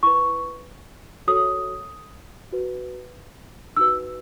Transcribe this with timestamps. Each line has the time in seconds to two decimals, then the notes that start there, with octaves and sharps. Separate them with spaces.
0.03 E4 B4 C#6
1.27 F#4 A4 C#5 D#6
2.52 F#4 B4
3.77 D#4 F#4 B4 E6